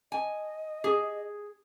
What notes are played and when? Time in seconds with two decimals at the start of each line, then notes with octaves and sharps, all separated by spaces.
0.12 D#5 G#5
0.84 G#4